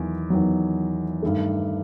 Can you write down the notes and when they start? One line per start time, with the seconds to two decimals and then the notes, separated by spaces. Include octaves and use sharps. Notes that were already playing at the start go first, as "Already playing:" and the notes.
Already playing: E2 D#3 F#3
0.30 E2 D#3 F#3
1.22 G2 D#3 A3